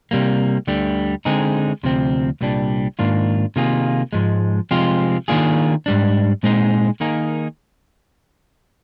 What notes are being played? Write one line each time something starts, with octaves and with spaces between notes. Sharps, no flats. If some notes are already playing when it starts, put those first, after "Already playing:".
C3 G3 A#3
D2 D3 G3
D3 G#3 C4 D#4 G#4
D2 C3 F3 C4
C2 A#2 G3 D4
G#2 D#3 A#3 D4 F4
C3 D#3 A#3 F4 G#4
G#2 F3 G#3
C3 F3 G#3 C4 F4
D#3 A#3 D4 F4 G#4
G#2 G3 D4
A#2 G#3 C4 D#4 G#4
D#3 A#3 D#4 G#4